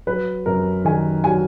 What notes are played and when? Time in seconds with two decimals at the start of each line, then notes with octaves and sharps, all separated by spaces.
0.07 F#3 B4
0.46 F#2 A#4
0.85 D#3 G#5
1.24 F#3 G#5